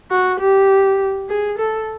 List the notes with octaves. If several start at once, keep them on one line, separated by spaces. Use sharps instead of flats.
F#4
G4
G#4
A4